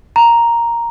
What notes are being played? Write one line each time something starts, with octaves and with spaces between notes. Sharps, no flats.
A#5